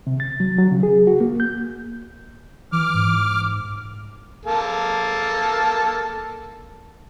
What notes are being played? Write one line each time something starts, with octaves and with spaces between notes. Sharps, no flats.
C3
A6
F#3
F#3
C#3
G#4
F#4
A#3
G6
E3 D6 F6
G#2
A#3 A4